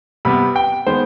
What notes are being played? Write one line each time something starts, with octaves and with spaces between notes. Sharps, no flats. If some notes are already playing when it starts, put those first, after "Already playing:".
C3 G3 B3 B5
G5
D#3 G#3 B3 C5